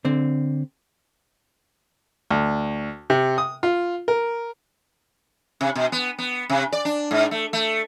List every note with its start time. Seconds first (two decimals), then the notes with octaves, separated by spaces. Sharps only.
0.05 D3 C4
2.30 D2
3.10 C3
3.38 D#6
3.63 F4
4.08 A#4
5.61 C3
5.76 B2
5.92 B3
6.19 B3
6.50 C3
6.72 D5
6.85 D4
7.11 G#2
7.31 A3
7.53 A3